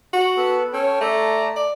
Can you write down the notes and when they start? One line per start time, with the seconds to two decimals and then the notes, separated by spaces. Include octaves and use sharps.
0.13 F#4
0.37 B3 A4 B4
0.73 C#4 A4 G5
1.01 A3 D5 A5 A#5
1.56 D5